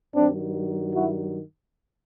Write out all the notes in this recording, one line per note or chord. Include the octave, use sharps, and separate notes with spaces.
G2 D#3 F#3 C4 D4
E4 F#4